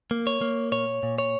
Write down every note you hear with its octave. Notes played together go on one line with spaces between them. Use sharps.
A#3
C#5
A#3
A#2 C#5
A#2
C#5